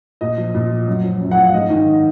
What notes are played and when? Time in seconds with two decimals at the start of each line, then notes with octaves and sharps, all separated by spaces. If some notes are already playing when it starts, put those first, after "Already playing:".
0.21 A#2 D#5
0.37 F3
0.54 A#2
0.71 F3
0.87 F#2
1.04 F3
1.21 F#2
1.31 F#5
1.37 F3
1.43 F5
1.54 G#2 D#5
1.70 D#3